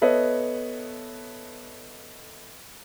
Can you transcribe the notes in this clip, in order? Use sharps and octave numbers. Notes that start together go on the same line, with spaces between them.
B3 A4 B4 C#5 D#5 E5